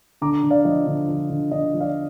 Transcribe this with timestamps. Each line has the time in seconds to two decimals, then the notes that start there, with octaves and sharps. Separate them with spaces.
0.21 D3 A#5 D6
0.43 D3
0.50 D5 F5
0.65 F3 D#5
0.87 D3
1.08 F3
1.30 D3
1.51 D3 D#5
1.74 F3
1.80 D5 F5